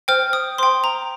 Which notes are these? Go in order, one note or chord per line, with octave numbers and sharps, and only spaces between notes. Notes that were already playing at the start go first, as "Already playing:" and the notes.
C5 G5 F6
D#6
C5 G5 C6
A#5